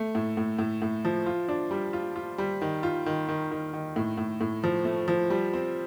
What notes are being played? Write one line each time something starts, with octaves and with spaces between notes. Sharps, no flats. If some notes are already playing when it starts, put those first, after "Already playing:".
Already playing: A3
A2
A2
A2
A2
F3
F4
D4
G3
F4
F4
G3
D#3
F4
D#3
D#3
D#3
D#3
A2
A2
A2
F3
A3
F3
G3
C4